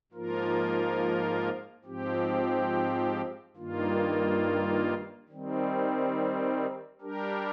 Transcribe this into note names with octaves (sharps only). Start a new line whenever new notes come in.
G#2 F3 A#3 F4 A#4
G#2 F3 C4 G4
G2 D#3 A#3 F4
D#3 G3 C4
G3 D4 G4 A#4